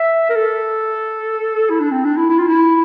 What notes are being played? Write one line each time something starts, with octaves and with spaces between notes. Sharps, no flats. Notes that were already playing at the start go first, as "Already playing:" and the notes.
Already playing: E5
A#4
A4
E4
D4
C4
D4
E4
E4
F4
E4